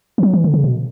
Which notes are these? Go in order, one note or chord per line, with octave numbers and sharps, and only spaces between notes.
E3
F#3
E3
D3
C#3
B2